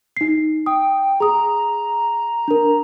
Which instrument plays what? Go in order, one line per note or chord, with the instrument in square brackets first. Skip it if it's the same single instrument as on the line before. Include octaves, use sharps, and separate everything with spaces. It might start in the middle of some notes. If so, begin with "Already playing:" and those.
[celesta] D#4 C7
[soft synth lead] G5 [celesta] D#6
[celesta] G#4 D#6 [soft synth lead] A#5
[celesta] D4 A#4